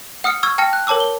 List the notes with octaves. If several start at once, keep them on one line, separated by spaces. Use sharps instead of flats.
F#5 D#6 F6 C#7
C#6 E6 F6 G#6
G5 A5 F6 A#6 C#7
F#6
A#4 C#5 A5 D6 E6
G7